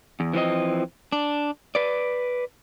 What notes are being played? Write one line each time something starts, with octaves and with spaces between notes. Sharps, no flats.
E2
E3 F3 C4 D#5
D4
B4 D5